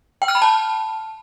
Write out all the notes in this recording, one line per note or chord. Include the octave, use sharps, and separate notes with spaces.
G5
F6
B5
A5